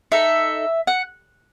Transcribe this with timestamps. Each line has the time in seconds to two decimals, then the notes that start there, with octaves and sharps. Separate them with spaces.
0.12 D#4 A4 E5
0.87 F#5